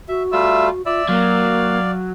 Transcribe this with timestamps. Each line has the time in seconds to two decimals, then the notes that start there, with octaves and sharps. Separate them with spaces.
0.09 F#4 E5
0.32 G3 A3 F4 E5
0.86 F4 D5 E5
1.09 F#3 A#3 F5